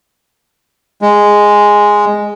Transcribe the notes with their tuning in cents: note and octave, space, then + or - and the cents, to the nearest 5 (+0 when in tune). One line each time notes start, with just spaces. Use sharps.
G#3 -5